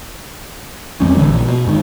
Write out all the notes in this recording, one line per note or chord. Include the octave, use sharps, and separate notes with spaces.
F2 G3 C4 C#4
A1 D3
A#1
B2
G1 G#2 B2 D#3